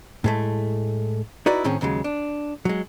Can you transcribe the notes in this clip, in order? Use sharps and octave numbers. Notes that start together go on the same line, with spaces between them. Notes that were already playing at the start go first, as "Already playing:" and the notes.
A2 G#3 A3
D#4 E4 F#4 B4 D5 D#5
A2 D#3 C4 C#4 G#4
D#2 C#3 F#3 G#3
D4
F#3 G#3